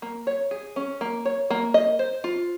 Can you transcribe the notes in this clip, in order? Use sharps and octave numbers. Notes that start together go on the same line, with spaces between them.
A#3
C#5
G#4
C#4
A#3
C#5
A#3
D#5
C5
F4